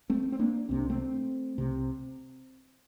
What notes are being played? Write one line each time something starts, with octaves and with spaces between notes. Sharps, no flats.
A3 C4
C4
A#3 D4
C2 C3 C4
D4
A3 C4
C2 C3